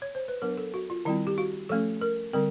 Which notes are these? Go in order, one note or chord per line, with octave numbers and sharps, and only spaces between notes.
C#5
C5
B4
F#3 B3 D4 A#4
A4
F#4
F4
D#3 G3 C4 E4
G4
F#4
F3 A3 C#4 A4
A#4
D3 G3 C4 A#4